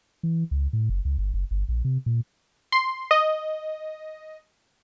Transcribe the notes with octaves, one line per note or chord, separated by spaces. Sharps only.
E3
C#2
A2
F#1
C#2
G1
F#1
G1
A#1
C3
A#2
C6
D#5